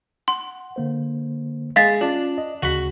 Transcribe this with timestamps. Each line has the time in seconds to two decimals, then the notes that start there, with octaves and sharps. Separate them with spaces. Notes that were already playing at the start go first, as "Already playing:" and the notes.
0.28 F#5 C6
0.76 D3 A#3 C5
1.76 G#3 F5 A6
2.01 C#4 D4 F4
2.38 D#5
2.63 D2 C#3 F#4 F#5 B5